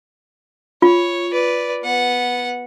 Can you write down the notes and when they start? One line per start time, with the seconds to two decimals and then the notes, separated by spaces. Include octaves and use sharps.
0.82 F4 C#5
1.32 B4 D5
1.83 B3 F#5